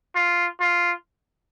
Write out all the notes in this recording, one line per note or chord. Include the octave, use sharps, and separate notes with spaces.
F4
F4